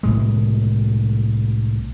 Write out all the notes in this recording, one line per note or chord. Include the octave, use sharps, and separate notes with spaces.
C2 A2 G#3